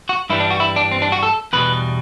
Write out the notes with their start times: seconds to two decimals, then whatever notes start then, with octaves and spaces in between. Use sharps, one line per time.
0.09 F#4
0.30 G2 E3 G3 E4
0.40 D4
0.51 F#4
0.60 E4
0.76 D4
0.92 C4
1.02 D4
1.12 F#4
1.23 A4
1.53 E2 B2 G3 B4